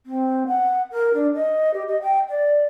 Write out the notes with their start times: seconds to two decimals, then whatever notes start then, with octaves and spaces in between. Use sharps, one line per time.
0.06 C4
0.47 F#5
0.91 A#4
1.14 D4
1.35 D#5
1.74 G4
1.88 D#5
2.02 G5
2.29 D5